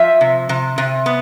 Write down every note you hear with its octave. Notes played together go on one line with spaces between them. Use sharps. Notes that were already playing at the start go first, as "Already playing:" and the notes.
Already playing: F3 E5
C3
C3
C3
B3